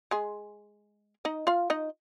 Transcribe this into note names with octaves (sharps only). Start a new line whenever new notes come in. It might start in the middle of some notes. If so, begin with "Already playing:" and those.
G#3 G#4
D#4 D#5
F4 F5
D#4 D#5